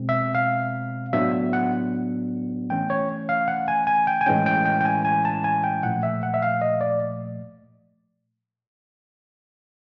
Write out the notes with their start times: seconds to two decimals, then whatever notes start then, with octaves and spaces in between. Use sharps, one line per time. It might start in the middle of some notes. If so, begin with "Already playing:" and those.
Already playing: B2 G#3 C4
0.09 E5
0.35 F5
1.13 A2 F#3 B3 D4 E5
1.53 F#5
2.70 E3 A3 C#4 G5
2.90 C#5
3.29 F5
3.48 F#5
3.68 G#5
3.87 G#5
4.07 G5
4.21 G#5
4.26 A2 E3 G#3 C#4 G5
4.46 G5
4.66 G5
4.81 G5
4.85 G#5
5.05 G#5
5.25 A5
5.44 G#5
5.64 G5
5.83 A#2 F3 A3 F#5
6.03 E5
6.23 F#5
6.34 E5
6.42 F5
6.62 D#5
6.81 D5